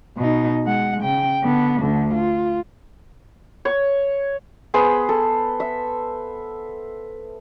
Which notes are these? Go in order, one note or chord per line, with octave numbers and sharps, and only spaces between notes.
B2 D#4
G#3 F#5
C#3 G5
D3 B3
D2 D3
F4
C#5
B3 G#4 C5 B5
A4
E5